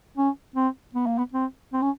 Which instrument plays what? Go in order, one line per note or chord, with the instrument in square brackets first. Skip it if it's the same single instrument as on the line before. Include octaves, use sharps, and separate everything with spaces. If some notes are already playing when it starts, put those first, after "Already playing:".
[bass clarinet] C#4
C4
B3
A#3
B3
C4
C4
C#4